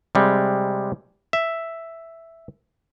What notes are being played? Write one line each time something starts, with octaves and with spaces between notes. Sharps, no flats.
C3 G3 G#3
E5